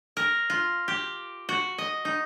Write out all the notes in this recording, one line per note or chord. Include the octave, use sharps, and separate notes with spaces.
A#4
F4
G4
F#4
D#5
D#4